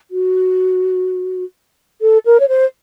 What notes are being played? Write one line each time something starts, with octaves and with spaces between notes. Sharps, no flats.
F#4
A4
A#4
C#5
C5